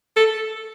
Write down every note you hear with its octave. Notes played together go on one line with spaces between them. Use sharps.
A4